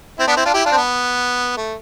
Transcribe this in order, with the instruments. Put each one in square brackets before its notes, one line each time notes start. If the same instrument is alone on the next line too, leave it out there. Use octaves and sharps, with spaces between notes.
[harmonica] C4 E4
B3 D4
C4 E4
D4 F4
E4 G4
D4 F4
C4
B3
A3